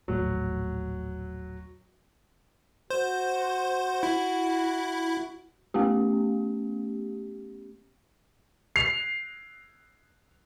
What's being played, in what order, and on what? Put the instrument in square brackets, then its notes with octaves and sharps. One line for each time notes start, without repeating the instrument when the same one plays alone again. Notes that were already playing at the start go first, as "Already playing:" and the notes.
[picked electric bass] D#1 A#1 A2 [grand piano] F#3
[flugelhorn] F#4 [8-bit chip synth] C5
[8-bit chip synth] E4
[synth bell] A3 B3 C#4 G4
[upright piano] C7 F7